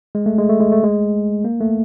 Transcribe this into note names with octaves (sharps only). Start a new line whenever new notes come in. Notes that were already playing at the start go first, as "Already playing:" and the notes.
G#3
A3
G#3
A3
G#3
A3
G#3
A#3
A3